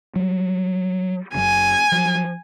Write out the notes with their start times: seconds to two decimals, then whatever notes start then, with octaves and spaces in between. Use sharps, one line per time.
0.16 F#3 G3
1.35 F#1 F#2 C#3 G#5
1.92 F3 F#3